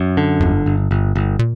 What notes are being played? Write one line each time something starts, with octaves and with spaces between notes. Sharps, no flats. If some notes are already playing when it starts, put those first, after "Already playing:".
Already playing: F#2
D3
G1 E2
F#2
G1 G2
G1
G1
A#2